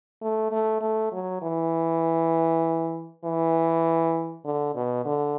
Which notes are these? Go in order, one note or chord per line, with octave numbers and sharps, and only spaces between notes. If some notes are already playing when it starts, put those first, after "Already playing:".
A3
A3
A3
F#3
E3
E3
D3
B2
D3